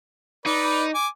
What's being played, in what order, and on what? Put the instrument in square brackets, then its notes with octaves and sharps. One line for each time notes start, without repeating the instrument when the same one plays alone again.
[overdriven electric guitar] D#4 [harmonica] B4 D5
[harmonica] G#5 D6